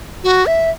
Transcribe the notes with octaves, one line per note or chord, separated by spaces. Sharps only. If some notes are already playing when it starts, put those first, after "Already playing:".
F#4
E5